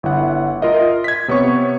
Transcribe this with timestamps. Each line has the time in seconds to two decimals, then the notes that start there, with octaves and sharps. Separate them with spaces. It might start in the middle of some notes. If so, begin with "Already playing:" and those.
0.03 G1 E4 F#5
0.61 F4 A#4 D#5 E5
1.04 G#6 B6
1.28 C3 B3 C#5 C#6